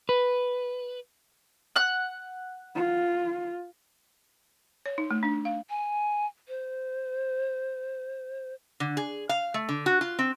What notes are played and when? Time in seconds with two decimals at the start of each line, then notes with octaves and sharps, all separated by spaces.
0.09 B4
1.76 F#5 F#6
2.75 F4
4.86 C#5
4.98 D#4
5.11 A3
5.23 D4
5.45 F5
5.69 G#5
6.48 C5
8.80 D3
8.97 G#4
9.29 F5
9.54 A3
9.69 D3
9.86 F#4
10.01 F4
10.19 C4